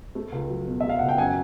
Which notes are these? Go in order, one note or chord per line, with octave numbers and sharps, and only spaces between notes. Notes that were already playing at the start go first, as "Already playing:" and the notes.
A3
C#2
F#3
B2
A3 E5
F5
C#2 F#5
G5
F#2 F#5 G#5